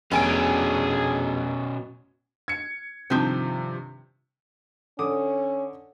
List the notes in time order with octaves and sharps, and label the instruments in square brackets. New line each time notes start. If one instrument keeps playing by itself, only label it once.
[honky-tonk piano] F1 G#5 D7 [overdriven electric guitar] B2 C#4 [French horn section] D4 G#4
[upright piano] G#6 C#7
[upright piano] G2 C3 D#3 [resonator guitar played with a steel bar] F3 C4
[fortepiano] D3 D6 D#6 [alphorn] C#4